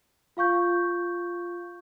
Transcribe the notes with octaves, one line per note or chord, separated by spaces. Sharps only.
F4 F5 C#6 G6